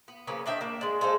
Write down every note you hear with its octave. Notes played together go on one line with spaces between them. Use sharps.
B3
C#3 F3 A#3 B3
D#3 D4 E5 G5
A#3 D4 E5
G#3 D4
G#3 F4 A4 C5